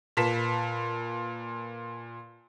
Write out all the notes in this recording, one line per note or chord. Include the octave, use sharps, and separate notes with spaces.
A#2 B4 A5 B6 E7